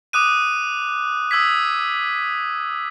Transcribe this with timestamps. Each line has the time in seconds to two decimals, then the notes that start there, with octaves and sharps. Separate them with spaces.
0.13 D6 D#6 F#6 D#7
1.31 D#6 E6 G#6 B6